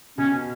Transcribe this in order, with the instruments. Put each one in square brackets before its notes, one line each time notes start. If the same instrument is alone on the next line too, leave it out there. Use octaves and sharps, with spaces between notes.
[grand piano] B2 [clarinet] C#4